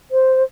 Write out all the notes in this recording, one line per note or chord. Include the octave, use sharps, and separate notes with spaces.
C5